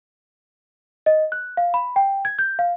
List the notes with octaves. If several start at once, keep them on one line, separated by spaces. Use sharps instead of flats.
D#5
F#6
F5
B5
G5
G#6
G6
F5